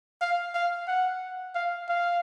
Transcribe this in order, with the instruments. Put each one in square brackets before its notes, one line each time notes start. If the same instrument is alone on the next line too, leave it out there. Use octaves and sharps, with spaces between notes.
[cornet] F5
F5
F#5
F5
F5